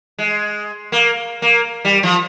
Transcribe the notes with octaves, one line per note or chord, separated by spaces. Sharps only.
G#3
A#3
A#3
G3
F3